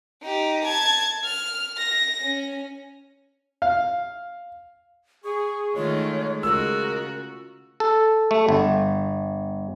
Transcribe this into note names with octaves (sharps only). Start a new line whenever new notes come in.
D#4 G4
A5 G#6
F6
A#6
C#4
F5
G#4 C#6
D#3 G#3 A3 F4 C#5
C#3 F4 F#4 A#4 E6
A4
A3
G1